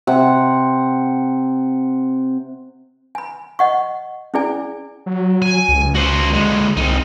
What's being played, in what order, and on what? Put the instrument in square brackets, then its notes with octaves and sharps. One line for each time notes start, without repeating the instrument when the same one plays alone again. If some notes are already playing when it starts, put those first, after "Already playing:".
[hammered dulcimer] C3 F#5
[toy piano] G#5 B5
D#5 F#5 C#6
C#4 E4 G#4 D5 G#5
[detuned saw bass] F#3
[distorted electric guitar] G#5
[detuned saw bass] C#2
[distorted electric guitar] F#4 C5
D3 G#3
[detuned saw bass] C2 [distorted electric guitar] C4 D#4